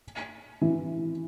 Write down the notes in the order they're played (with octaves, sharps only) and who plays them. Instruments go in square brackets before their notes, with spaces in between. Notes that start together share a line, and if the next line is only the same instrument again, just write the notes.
[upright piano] E3